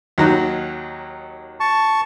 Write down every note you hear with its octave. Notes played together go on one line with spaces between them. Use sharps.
D#2 F#3 D#4
A5 C#6